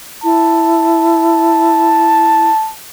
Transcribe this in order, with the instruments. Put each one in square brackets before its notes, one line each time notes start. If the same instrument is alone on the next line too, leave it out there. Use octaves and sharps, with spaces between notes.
[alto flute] E4 [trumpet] A5